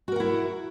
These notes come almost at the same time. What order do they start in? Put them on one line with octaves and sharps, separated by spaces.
F#4 A#4 F#5 E4